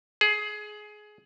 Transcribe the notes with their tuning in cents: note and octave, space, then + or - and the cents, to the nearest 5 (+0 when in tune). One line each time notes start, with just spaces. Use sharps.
G#4 +20